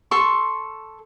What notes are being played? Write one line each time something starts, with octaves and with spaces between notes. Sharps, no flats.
A4 C6 C#6